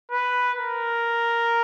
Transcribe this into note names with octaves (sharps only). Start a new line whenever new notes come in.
B4
A#4